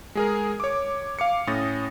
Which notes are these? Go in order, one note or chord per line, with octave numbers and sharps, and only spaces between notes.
G#3 G#4 A#4
C#5 D6
F5 D6 C#7
A2 C#4 D#6 A6 A#6